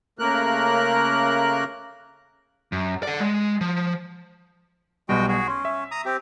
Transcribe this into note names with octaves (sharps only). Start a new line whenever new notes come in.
C#3 A3 A#3 A#4 F#6
F#2
D5 F#5
G#3
F3
B1 B2 G3 G#3 F#4 G5
F#4 G#4
C#4 C6
E5
A#5 D#6
C4 G4